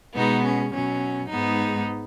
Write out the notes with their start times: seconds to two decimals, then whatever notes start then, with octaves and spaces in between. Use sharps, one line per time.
0.15 B2 G#3 B3 D#4
0.44 C#4
0.72 B2 F#3 C#4
1.29 G#2 G#3 B3 D#4